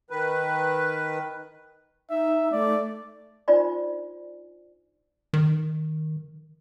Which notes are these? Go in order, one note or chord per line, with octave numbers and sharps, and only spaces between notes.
D#3 B4
D#4 E5
A3 D5
D4 D#4 F4 C5 D5 G#5
D#3